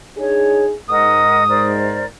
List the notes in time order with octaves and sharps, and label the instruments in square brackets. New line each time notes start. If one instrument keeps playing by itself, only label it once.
[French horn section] D4 D#4 G#4 [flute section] C#5
[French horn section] G#2 [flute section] A#4 D#5 F#5 [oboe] D#6
[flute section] A#4 C5 D5